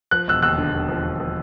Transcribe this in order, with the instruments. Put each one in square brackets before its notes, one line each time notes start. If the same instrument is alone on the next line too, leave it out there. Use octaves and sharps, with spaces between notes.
[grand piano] F3 F#6
E1 E6 F#6
D#2 E6 F#6
D3
D#2
F3
D#2
F3